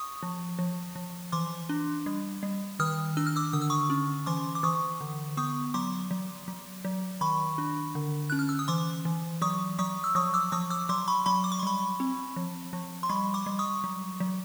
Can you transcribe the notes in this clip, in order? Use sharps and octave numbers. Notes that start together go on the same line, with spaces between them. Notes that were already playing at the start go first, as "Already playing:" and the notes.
Already playing: C#6 D#6
F3
F3
F3
E3 C6 D6
D4
G3
G3
D#3 D#6 F6
D4 E6
F6
D6 E6
D3 D#6
E6
C#6 D#6
C#4
E3 C6 D6
D6
E3 C#6 D#6
D3
B3 C#6 D#6
F#3 C6 D6
F#3
F#3
F#3
D#3 B5 C#6
D4
D3
C#4 F#6
F6
E6
D#6
E3 C6 D6
E3
F#3 C#6 D#6
F#3 C#6 D#6
E6
F3 C#6 D#6
D6 E6
F3 C#6 D#6
D6 E6
F#3 C6 D6
B5 C#6
F#3 B5 C#6
D6
C#6
C6
G3 B5 C#6
C4
F3
F3
C6
G3 B5 C#6
C6 D6
G3
C#6 D#6
F#3
F#3